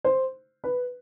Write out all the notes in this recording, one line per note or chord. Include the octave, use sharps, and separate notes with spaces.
C5
B4